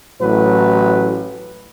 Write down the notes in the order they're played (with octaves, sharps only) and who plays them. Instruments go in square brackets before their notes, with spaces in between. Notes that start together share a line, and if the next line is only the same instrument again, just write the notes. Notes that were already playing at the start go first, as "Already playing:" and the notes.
[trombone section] A1 A2 F#3 B4